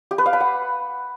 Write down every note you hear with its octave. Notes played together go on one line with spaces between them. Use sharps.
G4
B4
F5
B5
F#5